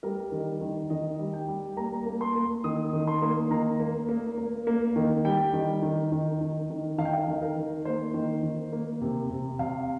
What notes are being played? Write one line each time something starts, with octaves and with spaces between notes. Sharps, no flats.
G3 A#4
D#3
D#3
D#3 D#5
G3
G5
G3
A#3 A#5
A#3
C6
A#3
D#3 D#6
D#3
C6
A#3
D#3 A#5
A#3
A#3
A#3
A#3
D#3
G3 G5
D#3
D#3
D#3
D#3
D#3
D#3 F5
G5
F5
D#3
A#4
D#3
A#3 C5
D#3
D#3
A#3
C3
C3
C3 F5